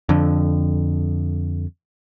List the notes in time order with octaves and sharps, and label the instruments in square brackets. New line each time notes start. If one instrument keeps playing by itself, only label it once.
[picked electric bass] F2 D3